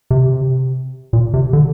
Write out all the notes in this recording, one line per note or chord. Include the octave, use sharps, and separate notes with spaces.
C3
A#2
C3
D3